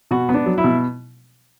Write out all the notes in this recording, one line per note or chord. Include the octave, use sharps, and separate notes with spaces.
B2 F#4
B3
D4
F#3
E4
B2